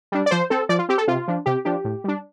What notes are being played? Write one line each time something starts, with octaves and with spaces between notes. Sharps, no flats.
G3 D4
D5
F3 C5
C4 A4
F3 D5
F4
C4 G4
A4
C3 F4
F3 D4
C3 G4
F3 D4 G4
A2
G3 D4